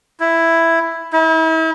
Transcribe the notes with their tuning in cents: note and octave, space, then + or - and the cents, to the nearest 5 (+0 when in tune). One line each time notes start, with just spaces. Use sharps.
E4 +5
E4 -40